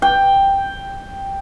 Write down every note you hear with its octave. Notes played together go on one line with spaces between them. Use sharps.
G5